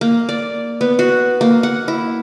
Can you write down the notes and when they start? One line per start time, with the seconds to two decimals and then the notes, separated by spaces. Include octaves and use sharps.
0.01 A#3
0.29 D5
0.81 B3
0.99 F#4
1.41 A#3
1.63 F#5
1.88 E4